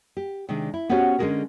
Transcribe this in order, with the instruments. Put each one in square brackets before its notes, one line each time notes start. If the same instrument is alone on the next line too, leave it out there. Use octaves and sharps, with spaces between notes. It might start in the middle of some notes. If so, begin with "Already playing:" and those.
[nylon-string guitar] G4
C3 D#3 G#3 D4
E4
B3 C#4 F#4 G4 C5 C#5
D3 G#3 C#4 F#4 G#4 A#4